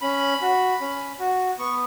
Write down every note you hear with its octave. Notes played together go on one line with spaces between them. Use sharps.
C#4 B5
F#4
C#4
F#4
B3 C#6